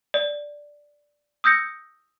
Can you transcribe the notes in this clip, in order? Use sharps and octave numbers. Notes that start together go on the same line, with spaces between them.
D5
D#6 E6 G6 A#6 C#7